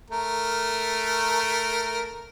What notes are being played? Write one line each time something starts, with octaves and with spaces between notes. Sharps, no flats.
A3 A#4